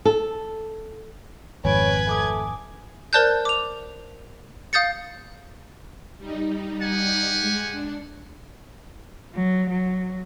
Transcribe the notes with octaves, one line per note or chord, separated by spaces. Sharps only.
A4
G#1 F2 B4 C#5 G#5 B5 G#6 D7
A3 G#5 D6 D#6
A#4 C5 D5 A5 F#6 G6
D6 F7
F5 D#6 G6 A6 C#7
G3 D#4
G4 F#5 G#5
G#3
D4
F#3
F#3